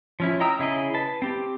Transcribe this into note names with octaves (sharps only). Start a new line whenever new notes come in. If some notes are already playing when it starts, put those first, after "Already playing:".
F3 C#4 E4
D#5 G5 A#5 D#6 E6
C#3 E4 G#4 D#5
B4 A5
C4 G4